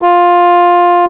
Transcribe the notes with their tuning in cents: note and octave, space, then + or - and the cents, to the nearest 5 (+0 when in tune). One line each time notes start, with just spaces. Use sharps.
F4 +10